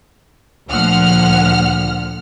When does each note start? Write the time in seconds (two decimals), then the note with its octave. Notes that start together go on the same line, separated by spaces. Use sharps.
0.70 D2 A#2 F3 F#5 F6